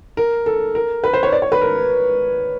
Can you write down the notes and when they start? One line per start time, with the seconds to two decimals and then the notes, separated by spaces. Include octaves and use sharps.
0.17 A#4
0.46 A4
0.75 A#4
1.04 B4
1.13 C5
1.23 C#5
1.32 D5
1.42 C#5
1.52 B4
1.61 A#4